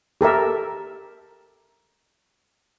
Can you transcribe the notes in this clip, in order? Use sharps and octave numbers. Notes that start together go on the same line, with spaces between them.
G4 A4 A#4 E5